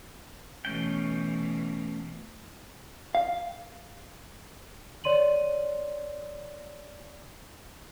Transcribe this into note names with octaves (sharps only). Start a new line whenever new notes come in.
B2 E3 A3 C#4 G5
F5
C#5 D5 C6 D#7 F#7